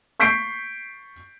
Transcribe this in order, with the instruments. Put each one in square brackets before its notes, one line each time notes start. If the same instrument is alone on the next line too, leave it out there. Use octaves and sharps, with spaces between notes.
[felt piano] C#6 G6 B6 C7 D7